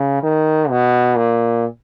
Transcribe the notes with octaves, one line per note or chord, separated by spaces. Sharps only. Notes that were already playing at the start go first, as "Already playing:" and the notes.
Already playing: C#3
D#3
B2
A#2